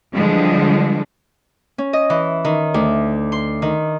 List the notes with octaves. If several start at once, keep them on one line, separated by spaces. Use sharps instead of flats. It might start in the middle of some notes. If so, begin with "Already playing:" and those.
D3 E3 F3 G3 G#3
C#4
D#5
E3
D#3
D2
C6
D#3